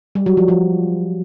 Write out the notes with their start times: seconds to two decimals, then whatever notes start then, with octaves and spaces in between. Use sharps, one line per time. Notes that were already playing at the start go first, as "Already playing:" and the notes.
0.15 G3
0.26 F#3
0.37 F3
0.48 F3